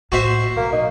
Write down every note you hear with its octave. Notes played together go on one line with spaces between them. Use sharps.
A2 A#3 F#4 C5 E5
B2 F#3 A#3
D#4